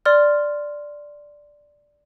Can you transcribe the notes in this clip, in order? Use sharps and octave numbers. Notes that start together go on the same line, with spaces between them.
D5 C6 F6